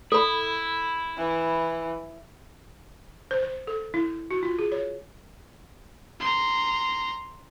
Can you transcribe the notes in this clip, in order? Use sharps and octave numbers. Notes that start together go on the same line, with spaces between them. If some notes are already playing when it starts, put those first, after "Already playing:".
E4 A4 B5
E3
C5
C5
A4
E4
F#4
F4
G#4
C#5
A#5 C6